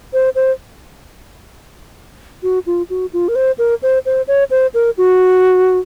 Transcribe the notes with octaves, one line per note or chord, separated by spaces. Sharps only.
C5
C5
F#4
F4
F#4
F4
A#4
C5
A#4
C5
C5
C#5
C5
A#4
F#4